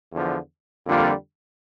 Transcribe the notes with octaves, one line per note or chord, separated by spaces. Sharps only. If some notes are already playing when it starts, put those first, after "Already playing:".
E2 D3 F3
F2 D3 G3 A#3 F4